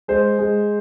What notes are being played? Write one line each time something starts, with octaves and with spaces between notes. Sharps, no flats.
G#3 C5
G#3